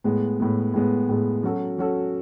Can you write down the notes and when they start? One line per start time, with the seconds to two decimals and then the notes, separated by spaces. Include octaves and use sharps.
0.04 A2 G#3 B3
0.40 A2 G#3 B3
0.74 A2 G#3 B3
1.09 A2 G#3 B3
1.43 F#3 C#4 F#4 A4
1.78 F#3 C#4 F#4 A4